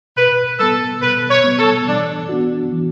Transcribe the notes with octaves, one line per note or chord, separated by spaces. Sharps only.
B2 B4
G3 B3 A4
B2 B4
C#5
G3 B3
A4
E3 D4
B3 D4 F#4
E3